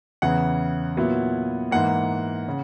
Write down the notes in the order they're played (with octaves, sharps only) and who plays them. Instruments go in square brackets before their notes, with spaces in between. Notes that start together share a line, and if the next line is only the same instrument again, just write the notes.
[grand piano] E2 C#3 E3 [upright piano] F#5
[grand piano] A#2 F#3 B3 E4
[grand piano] G#2 E3 A#3 [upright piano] F#5
[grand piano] C#3